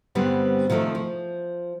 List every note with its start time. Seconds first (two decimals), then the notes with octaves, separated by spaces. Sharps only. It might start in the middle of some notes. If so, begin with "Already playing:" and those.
0.15 G2 D3 G3 B3 C4
0.70 C3 D#3 F3 G#3 A3
0.95 F3